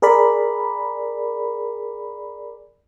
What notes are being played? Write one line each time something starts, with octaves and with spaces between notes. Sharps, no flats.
G#4 A#4 D5 B5